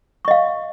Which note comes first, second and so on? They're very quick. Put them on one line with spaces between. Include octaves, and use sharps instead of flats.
C#6 D#5 F5